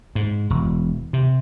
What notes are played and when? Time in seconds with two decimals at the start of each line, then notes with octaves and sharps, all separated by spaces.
0.15 G#2
0.50 E1
1.13 C3